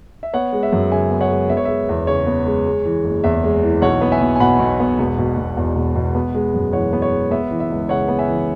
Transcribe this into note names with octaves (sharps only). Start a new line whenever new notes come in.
E5
B3 C#5 F#5
G#3
E5
F#2
C#3 E5 G#5
B3
C#5 F#5
G#3
B3 E5
C#5
G#3 E5
E2
C#3 C#5
B3
G#3
G#3
E3
F#1
E2 E5
G#3
E3
B1 C#5 F#5
B3
E5 G#5
B1
G#5
B2 F#5 B5
B1
B3
E1
B2
E1
E2
E1
B2
B3
G#3
F#2
E3 C#5 F#5
B3
C#5
G#3
B3 E5
E3
E5
C#2
C#3 C#5 F#5
B3
E5 G#5
E3